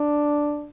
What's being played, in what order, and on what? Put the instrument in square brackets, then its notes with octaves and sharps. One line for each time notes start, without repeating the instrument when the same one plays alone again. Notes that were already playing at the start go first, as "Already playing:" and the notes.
Already playing: [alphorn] D4